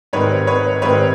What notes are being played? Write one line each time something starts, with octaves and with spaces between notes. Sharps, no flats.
G#2 D#3 G3 C4 B4 C#5
B4 C#5
G#2 D#3 G3 C4 B4 C#5